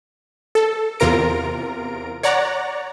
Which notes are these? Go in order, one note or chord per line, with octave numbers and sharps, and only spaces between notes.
A4
E2 C3 F4 A#4 A#5 D7
C#5 D5 F#5 A#5